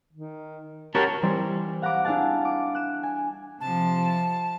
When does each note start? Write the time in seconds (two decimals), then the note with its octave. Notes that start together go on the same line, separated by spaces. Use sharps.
0.13 D#3
0.95 C#4 F#4 G4 A#4 A5
1.22 E3 G3 C4 C5 D5 C6
1.82 F5 F#5 A#5 B5 D6
2.05 D4 E4 G#4 F5 F#5 A5
2.45 D6
2.74 F#6 E7
3.03 G#5
3.61 C3 F3 A5